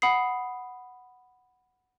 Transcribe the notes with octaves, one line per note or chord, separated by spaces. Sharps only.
F#5 B5 D#6 C7